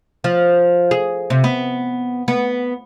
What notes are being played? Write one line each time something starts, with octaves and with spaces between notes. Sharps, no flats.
F3
G#4
C3
B3
B3